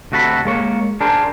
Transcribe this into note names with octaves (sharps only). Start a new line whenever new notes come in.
D2 C3 F#4 A4 A#5 B5
G#3 A#3 C#5
D4 G#4 A#4 C5